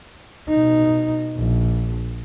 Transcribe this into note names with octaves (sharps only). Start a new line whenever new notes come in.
B2 D#4
A#1